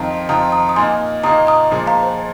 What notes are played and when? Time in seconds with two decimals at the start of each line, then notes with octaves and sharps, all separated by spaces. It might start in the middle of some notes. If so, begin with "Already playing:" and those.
Already playing: F2 D#3 C4 F4 A#5
0.29 F2 D#3 C4 F4 A#5 D#6
0.52 A#5 D#6
0.69 D#6
0.76 A#2 A#3 D#4 G#5 C6
1.24 A#2 A#3 D#4 A#5 D#6
1.47 A#5 D#6
1.71 A#2 F3 G#3
1.87 F5 A#5
2.03 C5